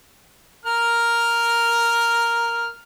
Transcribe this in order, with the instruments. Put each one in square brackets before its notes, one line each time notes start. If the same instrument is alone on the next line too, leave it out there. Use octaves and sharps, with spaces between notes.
[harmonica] A#4 F6